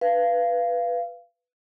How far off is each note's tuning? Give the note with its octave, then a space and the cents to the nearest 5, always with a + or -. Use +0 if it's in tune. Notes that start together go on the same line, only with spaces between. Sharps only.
B4 +0 F5 -20